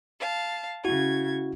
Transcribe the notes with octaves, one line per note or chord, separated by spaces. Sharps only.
F5 A5
C#3 E4 F#4 G#6